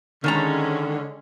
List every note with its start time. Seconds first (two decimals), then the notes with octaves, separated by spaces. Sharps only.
0.24 D3 D#3 G#3 C#4 A4 A#5